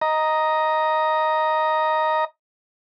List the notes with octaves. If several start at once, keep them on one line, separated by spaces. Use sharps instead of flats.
D#5 A#5